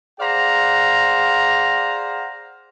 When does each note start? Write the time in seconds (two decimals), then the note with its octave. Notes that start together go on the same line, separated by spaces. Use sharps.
0.20 G#4 C5 D5 F5 F#5 A#5